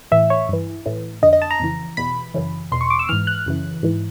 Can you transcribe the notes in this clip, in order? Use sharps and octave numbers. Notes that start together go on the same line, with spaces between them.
A2 E3 E5
C#5
G2 E3
A2 E3
F2 D3 D#5
D#5
A5
A#5
F2 C#3 E3
E2 B2 B5
F#2 C#3 E3
E2 B2 C6
C#6
D6
E6
G#2 E3 F6
F#6
F#2 C#3 E3
G#2 E3